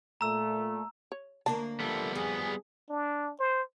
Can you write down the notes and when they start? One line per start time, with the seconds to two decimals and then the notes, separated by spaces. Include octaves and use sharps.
0.21 A#2 A3 A#5 E6
1.12 C#5
1.46 D2 A#3 D4 A5
1.80 F3 G3 A3 B3 A4
2.15 F2 G#4
2.90 D4
3.39 C5